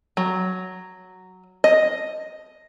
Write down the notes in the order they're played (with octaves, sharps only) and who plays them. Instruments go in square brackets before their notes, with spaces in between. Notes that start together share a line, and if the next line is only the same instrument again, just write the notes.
[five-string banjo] F#3
D#5